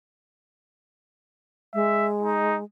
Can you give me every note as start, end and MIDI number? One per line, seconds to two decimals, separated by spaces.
1.74 2.63 56
1.74 2.07 76
2.23 2.57 63